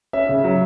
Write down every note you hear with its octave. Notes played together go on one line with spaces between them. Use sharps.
C#4 E5
C#3
F#3